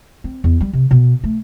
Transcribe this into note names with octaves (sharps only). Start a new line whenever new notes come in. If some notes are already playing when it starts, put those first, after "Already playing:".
C4
E2
G3
C3
B2
A3